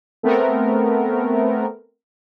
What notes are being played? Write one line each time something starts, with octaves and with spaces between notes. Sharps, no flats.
A3 B3 C4 A#4